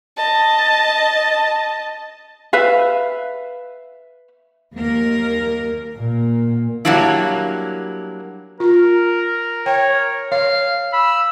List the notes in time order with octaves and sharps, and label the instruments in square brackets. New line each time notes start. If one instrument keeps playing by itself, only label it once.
[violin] D#5 A5
[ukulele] B4 E5 F5
[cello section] D#2 A#3 A#4
[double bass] A#2 A#3
[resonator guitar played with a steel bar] F#3 G3 A#3 D4 E4
[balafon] F4 [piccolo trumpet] A#4
[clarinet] C#5 [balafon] G5
[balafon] C#5 [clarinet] F5
[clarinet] B5 [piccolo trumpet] E6